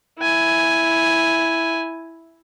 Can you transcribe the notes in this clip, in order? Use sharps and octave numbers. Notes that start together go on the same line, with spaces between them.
E4 G#5